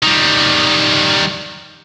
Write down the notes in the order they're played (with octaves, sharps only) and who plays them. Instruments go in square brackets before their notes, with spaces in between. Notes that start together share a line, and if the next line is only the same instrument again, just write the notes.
[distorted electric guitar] D#3 G3